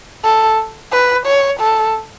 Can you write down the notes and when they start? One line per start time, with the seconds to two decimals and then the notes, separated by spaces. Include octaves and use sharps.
0.24 A4
0.92 B4
1.26 C#5
1.60 A4